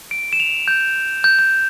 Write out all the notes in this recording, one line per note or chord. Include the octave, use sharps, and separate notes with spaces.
D7
E7
F7
G6
G6
G6